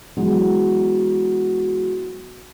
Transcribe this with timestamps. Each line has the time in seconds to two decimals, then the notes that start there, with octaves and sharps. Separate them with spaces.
0.17 E3 F#3 G#3 B3